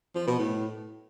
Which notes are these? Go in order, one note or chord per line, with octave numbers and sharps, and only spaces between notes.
F3
B2
A2